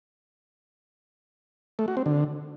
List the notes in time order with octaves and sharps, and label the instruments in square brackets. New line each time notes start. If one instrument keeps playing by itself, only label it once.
[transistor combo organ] A3
F#4
C4
D3